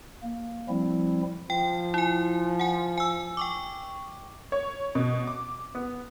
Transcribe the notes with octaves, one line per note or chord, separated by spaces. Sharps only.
A#3
F3 G3 C4 E4
F3 G5
E4 G#5
F#5 G#5
G#5 E6
G5 C#6 D6
C#5
B2
D6
B3